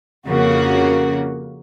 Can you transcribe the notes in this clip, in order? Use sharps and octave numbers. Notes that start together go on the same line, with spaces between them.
F2 C#3 A#3 F#4